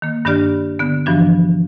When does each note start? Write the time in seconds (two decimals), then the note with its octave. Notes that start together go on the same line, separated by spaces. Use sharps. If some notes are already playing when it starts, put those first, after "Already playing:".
0.02 D#3 A#3
0.25 G2 D#3 D4 G4 D5 F6
0.79 D3 B3
1.06 G2 E3 F3 D4 F#4